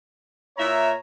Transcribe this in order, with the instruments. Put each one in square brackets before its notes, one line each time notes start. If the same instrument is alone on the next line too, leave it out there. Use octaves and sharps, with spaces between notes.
[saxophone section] A#2 E5 [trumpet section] C#5 A#5